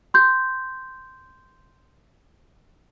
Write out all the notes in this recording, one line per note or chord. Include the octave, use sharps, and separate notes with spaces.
C6 G6